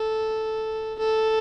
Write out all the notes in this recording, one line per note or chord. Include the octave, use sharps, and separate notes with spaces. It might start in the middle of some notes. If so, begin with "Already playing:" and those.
Already playing: A4
A4